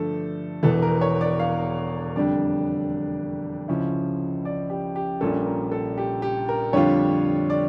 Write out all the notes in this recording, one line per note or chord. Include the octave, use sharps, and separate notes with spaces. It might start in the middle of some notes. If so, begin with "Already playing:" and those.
Already playing: G2 D3 F3 A3 A4
E1 E2 E3 A4
A#4
C#5
D5
F5
F2 D3 G3 D4 D5
C#2 C#3 F3 C#4 E4
D5
G4
G4
A#1 A#2 G3 C#4 A4
A#4
A4
G4
G4
A#4
F2 D3 G3 D4 F4 C#5
D5